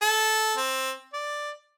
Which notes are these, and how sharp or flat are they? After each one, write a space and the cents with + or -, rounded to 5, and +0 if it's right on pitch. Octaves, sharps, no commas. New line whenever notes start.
A4 -15
C4 +10
D5 +5